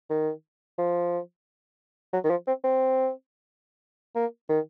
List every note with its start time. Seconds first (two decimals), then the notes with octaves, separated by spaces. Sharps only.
0.10 D#3
0.78 F3
2.13 F#3
2.24 D#3
2.30 F3
2.47 C4
2.64 C4
4.15 A#3
4.49 D#3